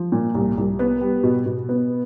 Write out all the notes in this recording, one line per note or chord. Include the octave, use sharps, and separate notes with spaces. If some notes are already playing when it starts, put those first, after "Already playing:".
Already playing: F3
A#2
C2
C2
B3
G3
B2
B2
B3